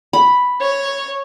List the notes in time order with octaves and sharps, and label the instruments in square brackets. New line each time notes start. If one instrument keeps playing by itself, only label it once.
[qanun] B5
[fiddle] C#5